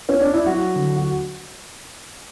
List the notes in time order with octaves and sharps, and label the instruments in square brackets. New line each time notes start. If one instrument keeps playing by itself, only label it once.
[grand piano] C#4
D4
E4
F#3 F#4
D3
F#4